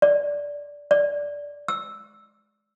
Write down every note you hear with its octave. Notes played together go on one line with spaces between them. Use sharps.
D5
D5
E6